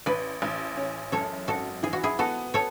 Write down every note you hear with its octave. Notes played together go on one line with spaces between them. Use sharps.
A1 B4 D5
A1
C#4
F#2 A4 C#5
G#1 F#4 A4
E3 G#4
F#4
E4 G#4
B3 F#4 A4
A4 C#5